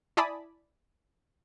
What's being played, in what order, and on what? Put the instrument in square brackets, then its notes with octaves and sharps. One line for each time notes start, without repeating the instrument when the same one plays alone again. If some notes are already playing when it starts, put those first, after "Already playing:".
[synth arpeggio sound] E4 D5 G#5 A5 B5 D#6